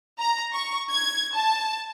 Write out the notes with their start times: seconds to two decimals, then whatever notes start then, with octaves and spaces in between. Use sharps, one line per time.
0.19 A#5
0.53 C#6
0.91 G#6
1.34 A5